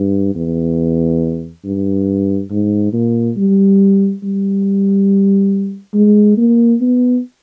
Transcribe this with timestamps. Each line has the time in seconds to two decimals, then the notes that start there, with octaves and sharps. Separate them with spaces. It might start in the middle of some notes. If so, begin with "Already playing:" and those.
Already playing: G2
0.35 E2
1.65 G2
2.51 G#2
2.93 A#2
3.37 G3
4.23 G3
5.94 G#3
6.37 A#3
6.81 B3